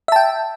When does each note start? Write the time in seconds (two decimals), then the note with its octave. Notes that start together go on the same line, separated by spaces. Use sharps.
0.08 E5
0.12 A5
0.16 G5